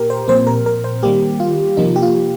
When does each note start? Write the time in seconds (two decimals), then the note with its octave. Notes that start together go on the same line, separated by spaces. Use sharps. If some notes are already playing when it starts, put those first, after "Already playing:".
Already playing: A#2 A#3 G4 A#4
0.10 C5
0.28 A#2 F3 C4 C5
0.47 A#4
0.66 A#4
0.84 C5
1.03 D#3 G3 A#3 G4
1.40 F4
1.77 C3 F3 A#3 D#4
1.96 G4
2.02 F4